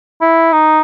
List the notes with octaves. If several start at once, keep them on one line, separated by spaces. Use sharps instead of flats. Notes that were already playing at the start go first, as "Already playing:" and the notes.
E4
D#4